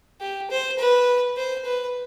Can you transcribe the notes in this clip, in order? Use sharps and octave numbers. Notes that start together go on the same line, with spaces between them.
G4
C5
B4
C5
B4